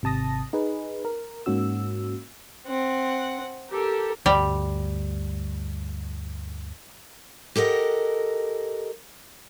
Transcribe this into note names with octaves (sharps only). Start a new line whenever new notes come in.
G#1 C3 A5 D#6 A#6
D#4 G#4 B4
A#4
G#2 A#3 C#4 F#4 E6
C4 F#5
G4 A4 A#4
D2 G2 G3
G4 A4 A#4 D#5 F#5